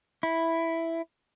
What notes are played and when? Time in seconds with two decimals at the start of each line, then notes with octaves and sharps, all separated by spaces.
0.23 E4